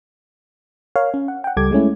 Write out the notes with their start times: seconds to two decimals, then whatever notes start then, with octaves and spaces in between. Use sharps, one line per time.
0.96 A#4 C#5 F5
1.14 C#4
1.28 F#5
1.44 F#5 G5
1.56 C#2 G3 A4 D6 G#6
1.71 G#3 A3 C#4 E4